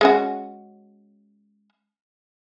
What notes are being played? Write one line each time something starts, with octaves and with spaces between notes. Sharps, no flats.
G#3 C#4 F#4